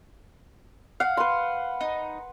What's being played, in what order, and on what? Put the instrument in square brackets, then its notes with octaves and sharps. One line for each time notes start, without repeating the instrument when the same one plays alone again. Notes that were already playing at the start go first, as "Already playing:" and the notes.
[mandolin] F5 [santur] F#5
[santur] B4 C6
[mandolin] D#4